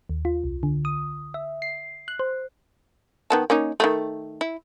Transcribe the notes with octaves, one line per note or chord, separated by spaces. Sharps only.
D#2
F4
C2
D3
D#6
E5
C7
F#6
C5
D#3 B3 A5
A#3 C#4 D#4
D#3 G3 A3
E4